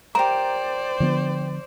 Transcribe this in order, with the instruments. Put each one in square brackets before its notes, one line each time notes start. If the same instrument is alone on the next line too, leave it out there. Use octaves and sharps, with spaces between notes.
[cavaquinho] G4 A#4 [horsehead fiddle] C5 D5 [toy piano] A#5
[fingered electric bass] D3 F3 B3